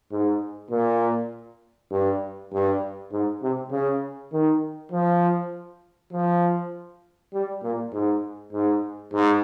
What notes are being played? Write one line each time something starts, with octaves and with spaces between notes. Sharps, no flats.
G#2
A#2
G2
G2
G#2
C3
C#3
D#3
F3
F3
G3
A#2
G#2
G#2
G#2